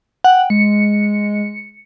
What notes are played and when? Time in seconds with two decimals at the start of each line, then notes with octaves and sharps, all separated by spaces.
0.24 F#5 G5
0.50 G#3 C#7